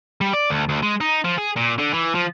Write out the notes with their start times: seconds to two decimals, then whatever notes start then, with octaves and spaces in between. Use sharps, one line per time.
0.21 G3
0.33 D5
0.50 D2
0.69 D2
0.83 G#3
1.01 D#4
1.24 F3
1.38 G#4
1.56 A#2
1.78 D3
1.93 E3
2.15 F3